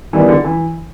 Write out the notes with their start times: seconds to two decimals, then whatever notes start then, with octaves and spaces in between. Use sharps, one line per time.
0.13 D#3 E3 G3 B3 E4
0.29 D3
0.44 E3